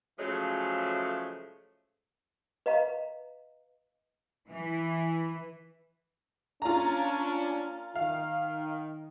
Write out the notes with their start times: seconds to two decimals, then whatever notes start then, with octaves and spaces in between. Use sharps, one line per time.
0.18 C#3 F3 F#3 G#3 A3
2.66 B4 D#5 F5 A#5
4.49 E3
6.62 A#3 C#4 D4 F4 A#5
7.96 D#3 F5